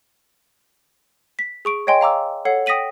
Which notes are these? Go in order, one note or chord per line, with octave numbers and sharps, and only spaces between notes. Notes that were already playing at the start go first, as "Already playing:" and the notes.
B6
G#4 C#6 D7
C#5 D#5 G5 G#5 C6
F5 A#5 D6 E6
A4 C#5 F#5 C7
G5 D#6 A#6 B6 D#7 F#7